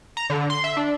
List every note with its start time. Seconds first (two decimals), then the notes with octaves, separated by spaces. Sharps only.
0.17 A#5
0.30 D3
0.50 C6
0.64 E5
0.77 D4